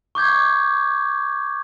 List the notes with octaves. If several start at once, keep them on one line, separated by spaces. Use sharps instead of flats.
C#6 D6 G6 G#6